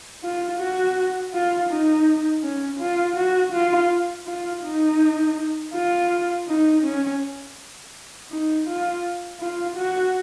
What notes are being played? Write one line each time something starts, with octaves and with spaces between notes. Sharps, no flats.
F4
F#4
F4
D#4
C#4
F4
F#4
F4
F4
D#4
F4
D#4
C#4
D#4
F4
F4
F#4